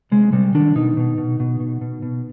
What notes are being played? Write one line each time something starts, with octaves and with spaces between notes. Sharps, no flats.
C3 G#3
C3 G3
D#3 D4
B2 D#4
B2
B2
B2
B2
B2
B2